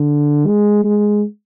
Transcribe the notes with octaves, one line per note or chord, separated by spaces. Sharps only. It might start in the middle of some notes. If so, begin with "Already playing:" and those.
Already playing: D3
G#3
G#3